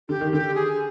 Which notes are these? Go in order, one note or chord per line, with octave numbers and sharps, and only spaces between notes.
D3 G4
D#3
D3 G4
G#4